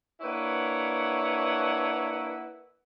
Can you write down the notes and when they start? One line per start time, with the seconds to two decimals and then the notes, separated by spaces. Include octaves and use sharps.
0.21 A#3 D4 E4 B4 C#5 F#5